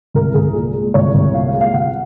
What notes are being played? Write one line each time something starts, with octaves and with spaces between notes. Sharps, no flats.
C2 A#4
C2 G#4
A#2
G#3
C2 C#5
C2
A#2 F5
G#3
F5
C2 F#5